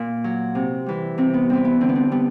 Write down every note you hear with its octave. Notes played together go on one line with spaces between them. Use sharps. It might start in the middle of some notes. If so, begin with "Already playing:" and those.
Already playing: A#2
F#3
C3
E3 G3
C3 C4
B3
E3 G3 C4
B3
D3 C4
B3
C4
G3 B3